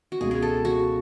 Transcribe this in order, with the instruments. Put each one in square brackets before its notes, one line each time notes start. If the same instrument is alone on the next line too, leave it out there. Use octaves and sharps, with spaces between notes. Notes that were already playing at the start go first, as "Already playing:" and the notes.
[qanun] F#4
[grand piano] C#2 B2 G#3 [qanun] G#4
[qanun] G#4
A4
F#4